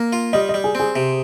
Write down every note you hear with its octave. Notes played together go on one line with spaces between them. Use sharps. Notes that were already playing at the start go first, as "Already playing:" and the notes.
Already playing: A#3
F4
G3 D#5
D#5
G3
G#4
C4 G#4
C3